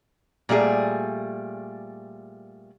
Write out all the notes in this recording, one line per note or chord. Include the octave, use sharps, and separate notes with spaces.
A#2 G3 A3 G#4